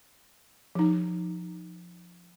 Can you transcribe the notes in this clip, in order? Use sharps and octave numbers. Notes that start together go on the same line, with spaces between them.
F3 D#4